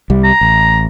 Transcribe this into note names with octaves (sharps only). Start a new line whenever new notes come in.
C2 G3
A#5
A1